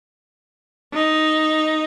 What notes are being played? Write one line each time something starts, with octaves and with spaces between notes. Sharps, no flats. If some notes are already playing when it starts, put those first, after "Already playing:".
D#4